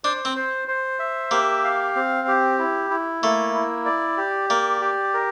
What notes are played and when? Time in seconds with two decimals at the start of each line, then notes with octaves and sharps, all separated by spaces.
0.04 D4 C5
0.25 C4
0.36 C5
0.68 C5
0.99 E5
1.31 A#3 G4
1.64 F5
1.96 C4
2.28 G4
2.59 E4
2.90 E4
3.22 A3 A#3
3.55 E4
3.86 D5
4.17 G4
4.50 A#3 D5
4.81 G4
5.14 A#4